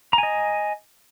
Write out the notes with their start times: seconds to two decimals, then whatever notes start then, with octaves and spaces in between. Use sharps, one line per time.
0.13 A#5
0.18 G#5
0.23 D#5